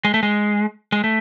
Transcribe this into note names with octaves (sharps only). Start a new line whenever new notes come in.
G#3
A3
G#3
G#3
A3